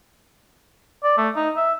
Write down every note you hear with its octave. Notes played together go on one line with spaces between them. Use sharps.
D5
A3
D#4
E5